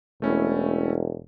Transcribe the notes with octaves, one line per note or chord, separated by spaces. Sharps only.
E1 A3 C#4 E4